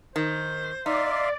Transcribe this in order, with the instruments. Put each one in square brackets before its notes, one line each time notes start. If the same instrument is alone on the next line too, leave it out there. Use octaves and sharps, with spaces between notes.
[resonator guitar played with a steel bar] D#3 [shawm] C5
[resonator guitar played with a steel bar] D#4 [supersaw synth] D5 [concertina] E5 F5 C6